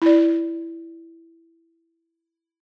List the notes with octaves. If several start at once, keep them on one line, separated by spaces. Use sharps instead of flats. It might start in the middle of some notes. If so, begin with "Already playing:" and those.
E4 D5